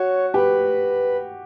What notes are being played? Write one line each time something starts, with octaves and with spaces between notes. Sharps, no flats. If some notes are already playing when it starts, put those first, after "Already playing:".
Already playing: F#4 C#5
G4 B4